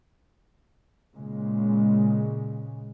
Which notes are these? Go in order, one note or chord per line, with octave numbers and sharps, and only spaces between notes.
A#2 C#3 G#3